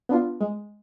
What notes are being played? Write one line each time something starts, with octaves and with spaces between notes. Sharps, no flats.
B3 D4 F4
G#3